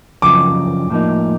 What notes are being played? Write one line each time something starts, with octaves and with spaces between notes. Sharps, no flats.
F#2 C#3 F3 D6
A2 F3 A#3 D#4